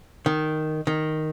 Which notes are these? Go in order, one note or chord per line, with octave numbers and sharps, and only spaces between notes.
D#3
D#3